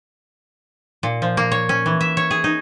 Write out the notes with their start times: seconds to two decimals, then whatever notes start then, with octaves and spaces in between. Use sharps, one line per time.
1.03 A#2
1.22 F3
1.37 A#3
1.52 C#5
1.69 C#4
1.86 E3
2.01 E5
2.17 C#5
2.31 G#4
2.44 D#4